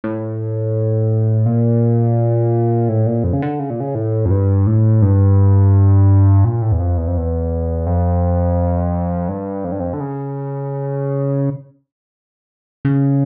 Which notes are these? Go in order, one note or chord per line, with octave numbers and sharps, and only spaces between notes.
A2
A#2
A2
A#2
F2
C#3
D3
C#3
A#2
C#3
A2
F2
G2
A2
G2
A#2
A2
E2
F2
E2
F2
E2
F2
G2
F2
G2
F2
D3
C#3
C#3